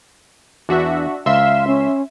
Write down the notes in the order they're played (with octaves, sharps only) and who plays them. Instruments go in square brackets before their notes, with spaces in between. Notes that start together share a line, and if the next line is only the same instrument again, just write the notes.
[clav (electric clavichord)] E2 E3 [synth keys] D4 F#4 E5
[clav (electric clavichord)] C#2 [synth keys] E5 C6 E6 [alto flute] F5
[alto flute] C#4